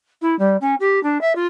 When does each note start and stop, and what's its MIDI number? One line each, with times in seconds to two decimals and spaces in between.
0.22 0.38 64
0.39 0.57 55
0.61 0.75 61
0.80 1.02 67
1.03 1.20 62
1.21 1.33 76
1.36 1.47 65